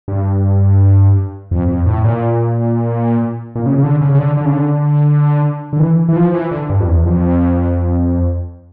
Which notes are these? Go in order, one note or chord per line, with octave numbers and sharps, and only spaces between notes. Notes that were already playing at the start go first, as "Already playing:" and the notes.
G2
F2
F2
A2
A#2
A#2
C#3
C#3
D3
C#3
C#3
D3
D3
C#3
D3
D3
E3
E3
F3
E3
D3
G2
F2
E2
F2